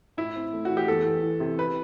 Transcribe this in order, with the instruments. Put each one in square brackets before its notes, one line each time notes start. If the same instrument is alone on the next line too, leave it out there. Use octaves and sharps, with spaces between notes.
[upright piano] A2 E4
C4
A3
F#4
E3
G4
E2 A4
E2
E3
C3
C3 B4